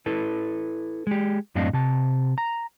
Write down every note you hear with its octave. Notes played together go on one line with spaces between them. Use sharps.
E4 A4 B4
G#3 G4
F#2 A2 C4 D4 D#5 F5
C3 A5
A#5